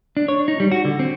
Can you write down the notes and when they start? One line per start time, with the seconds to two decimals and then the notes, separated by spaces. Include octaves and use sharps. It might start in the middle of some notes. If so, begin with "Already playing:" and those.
0.17 D4
0.28 C#5
0.48 D#4
0.60 G3
0.72 F#4
0.85 D3
0.99 C4